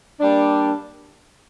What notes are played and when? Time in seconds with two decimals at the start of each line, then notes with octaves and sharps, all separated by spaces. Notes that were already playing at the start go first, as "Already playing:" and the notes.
0.20 G3 A#3 D4